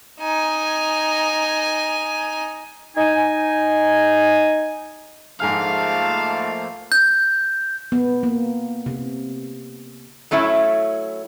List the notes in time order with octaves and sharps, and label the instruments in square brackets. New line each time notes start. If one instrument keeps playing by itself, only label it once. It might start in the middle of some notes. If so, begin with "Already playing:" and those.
[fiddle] D#4 G#5
[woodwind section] D#4 G#5
[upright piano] G#2 G#4 F6 [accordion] F3 A3 A#3 [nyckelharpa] F5 [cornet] A5
[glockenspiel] G6
[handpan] B3
A#3
C3
[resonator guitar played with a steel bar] F#3 A3 C#4 E4